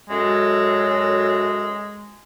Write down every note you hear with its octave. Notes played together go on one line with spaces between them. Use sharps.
F#2 G#3 F#4 A4